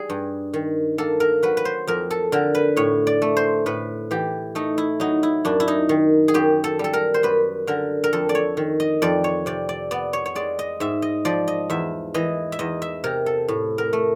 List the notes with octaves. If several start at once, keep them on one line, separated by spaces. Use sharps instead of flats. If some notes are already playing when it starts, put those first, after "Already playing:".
Already playing: G3 G#4
G2
D#3
A#3 A4
A#4
F#3 B4
B4
C5
F2 A#4
A4
D3 A#4
B4
A2 C#5
D5
A3
C5
A2 B4
E3 G4
A3 D#4
E4
F#3 D#4
E4
F#2 D4
E4
D#4
D#3
G#4
F#2 G4
A4
G3 A4
A#4
C5
F#2 B4
D3 A#4
A#4
F2 A4
D5
C#5
D#3
D#5
F2 D5
C#5
C3 D5
D5
B3 D5
C#5
C#5
G#3 D5
D#5
G#2 E5
D#5
F3 D5
D#5
E2 E5
E3 D#5
E5
E2 D#5
E5
C3 A#4
A4
A2
A#4
A3